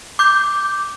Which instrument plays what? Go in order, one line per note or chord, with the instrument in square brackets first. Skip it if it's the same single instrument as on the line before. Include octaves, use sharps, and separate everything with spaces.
[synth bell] D6 G6